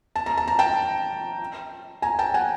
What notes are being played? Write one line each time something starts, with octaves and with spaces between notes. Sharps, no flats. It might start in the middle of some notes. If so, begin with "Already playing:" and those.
A5
A#5
A5
A#5
G5 A5
G#5 A#5
G5 A5
F#5 G#5